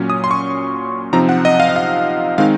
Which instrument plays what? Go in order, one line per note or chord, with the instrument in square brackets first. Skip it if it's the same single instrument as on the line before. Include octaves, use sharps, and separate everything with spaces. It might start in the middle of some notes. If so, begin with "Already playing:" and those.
Already playing: [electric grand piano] A#2 F#3 C#4
D#6
C6
C#6
C3 F3 C4 D#4 A#5
F#5
D#5
F5
D#5
F5
D#3 G#3 C4 D#4 F5